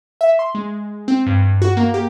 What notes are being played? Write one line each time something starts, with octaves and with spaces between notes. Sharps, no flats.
E5
C6
G#3
C4
G2
G2
F#4
A#3
G4